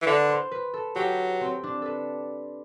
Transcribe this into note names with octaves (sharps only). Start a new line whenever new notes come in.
E3
D3 B4
C5
B4
A4
F#3 G4
C4
D4
A4 B4